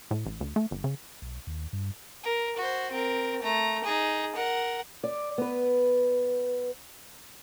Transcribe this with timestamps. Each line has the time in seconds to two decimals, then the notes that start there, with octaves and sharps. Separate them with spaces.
0.11 A2
0.26 A1
0.41 D2
0.56 A3
0.71 G1
0.84 C#3
1.22 B1
1.47 D#2
1.73 G2
2.23 A#4
2.57 F#4 C5
2.92 C4 A#4
3.43 A3 A#5
3.84 D#4 G#4
4.35 A#4 F#5
5.04 D5
5.38 B3 B4